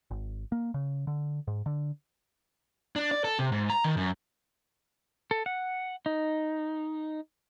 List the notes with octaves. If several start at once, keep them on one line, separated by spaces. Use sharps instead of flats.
G#1
A#3
C#3
D3
G#2
D3
D4
D5
A4
C3
G#2
A#5
D#3
F#2
A4
F#5
D#4